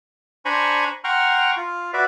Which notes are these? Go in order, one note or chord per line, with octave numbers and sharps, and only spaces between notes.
D4 C5 G#5 A#5 B5 C#6
F#5 G5 A#5 C6 C#6 F6
F4
F#4 B4 D5 E5